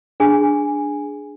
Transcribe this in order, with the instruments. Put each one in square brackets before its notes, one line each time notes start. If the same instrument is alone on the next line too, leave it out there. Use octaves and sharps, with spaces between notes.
[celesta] D4 G#4 G#5